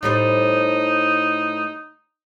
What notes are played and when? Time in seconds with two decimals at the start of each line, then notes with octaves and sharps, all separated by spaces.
0.03 A2 G3 D#4 C5